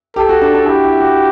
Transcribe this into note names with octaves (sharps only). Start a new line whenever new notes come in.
G4 A4
F#4
D4
D4
E4 G4
E4
F#4